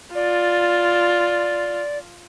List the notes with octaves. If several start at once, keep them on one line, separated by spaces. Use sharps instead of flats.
F4 D5